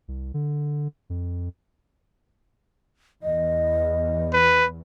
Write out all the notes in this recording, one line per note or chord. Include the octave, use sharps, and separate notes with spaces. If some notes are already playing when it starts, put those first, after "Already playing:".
C2
D3
F2
E2 D#5
B4